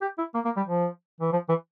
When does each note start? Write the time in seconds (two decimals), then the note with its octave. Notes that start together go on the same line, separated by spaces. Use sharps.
0.01 G4
0.18 E4
0.34 A#3
0.45 A#3
0.56 G3
0.67 F3
1.20 E3
1.32 F3
1.49 E3